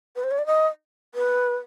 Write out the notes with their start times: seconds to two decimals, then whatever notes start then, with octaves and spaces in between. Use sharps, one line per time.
0.16 B4
0.24 C5
0.31 C#5
0.38 D5
0.46 D#5
1.15 B4